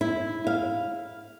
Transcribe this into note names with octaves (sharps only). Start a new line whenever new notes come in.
E4
F5